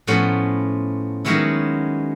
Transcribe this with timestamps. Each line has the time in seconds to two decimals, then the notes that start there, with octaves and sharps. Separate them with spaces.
0.07 A2 F3 B3 C#4 F#5 C6
1.25 D#3 F#3 G#3 B3 C#4 E4